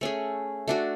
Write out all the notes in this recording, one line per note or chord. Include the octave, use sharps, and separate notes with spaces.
A3 C#4 G#4
A3 D4 F#4